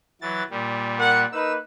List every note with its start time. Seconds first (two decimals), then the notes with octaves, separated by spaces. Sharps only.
0.22 E3 F#3 A6
0.50 A#2 G3
0.99 A#4 F#5
1.33 A#3 D#4 B4 E6